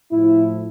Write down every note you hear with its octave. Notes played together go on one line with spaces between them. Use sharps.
A2 F3 E4